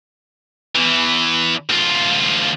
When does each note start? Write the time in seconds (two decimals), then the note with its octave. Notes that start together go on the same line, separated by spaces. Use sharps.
0.75 E2 E3
1.69 D2 F4